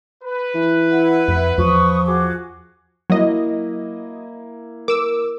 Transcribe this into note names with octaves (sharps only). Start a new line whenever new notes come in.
B4
E3
E4 E5 F#5
F2
E2 F3 C#6 D#6
F#4 G#4 D6
F#3 A#3 E4 D#5
A#4 D6 E6